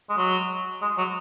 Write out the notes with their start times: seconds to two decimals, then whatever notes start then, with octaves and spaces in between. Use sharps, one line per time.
0.09 G#3
0.17 F#3
0.82 G#3
0.98 F#3